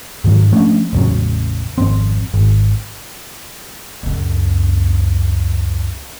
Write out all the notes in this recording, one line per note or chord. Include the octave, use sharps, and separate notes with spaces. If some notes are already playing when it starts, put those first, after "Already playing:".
G#2 D#3 F3 F#3
F3 A3 C#4 D4
A1 E2 C#3 F#3
G#1 F2 C4
G#1
C#2 F#2